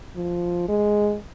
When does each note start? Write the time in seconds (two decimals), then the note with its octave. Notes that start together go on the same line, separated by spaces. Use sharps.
0.16 F3
0.68 G#3